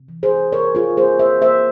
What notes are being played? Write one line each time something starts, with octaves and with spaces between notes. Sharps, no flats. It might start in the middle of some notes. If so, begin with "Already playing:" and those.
Already playing: C3
E3
G#4 C5
C3 A#4 C#5
F4 G#4
A#3 G#4 C5
C5 E5
A#3 C5 E5